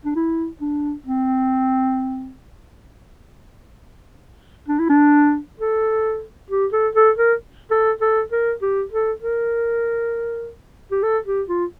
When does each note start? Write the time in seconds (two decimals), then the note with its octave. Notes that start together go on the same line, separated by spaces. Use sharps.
0.05 D4
0.16 E4
0.61 D4
1.06 C4
4.68 D4
4.79 E4
4.90 D4
5.60 A4
6.50 G4
6.73 A4
6.95 A4
7.18 A#4
7.71 A4
8.01 A4
8.32 A#4
8.62 G4
8.92 A4
9.22 A#4
10.91 G4
11.03 A4
11.26 G4
11.49 F4